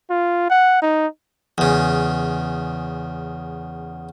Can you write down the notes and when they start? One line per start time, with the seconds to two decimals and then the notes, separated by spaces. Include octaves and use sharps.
0.10 F4
0.50 F#5
0.82 D#4
1.58 E2 C#3